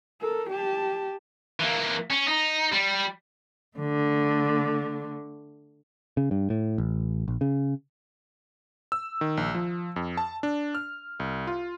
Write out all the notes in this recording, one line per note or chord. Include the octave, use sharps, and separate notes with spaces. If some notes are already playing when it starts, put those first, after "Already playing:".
A4 A#4
G4 A5
E3 A#3
C#4
D#4
G3
D3 A3
C#3
G2
A2
A1
A#1
C#3
E6
D#3
A#1
F3
F2
A5
D4
F6
C2
F4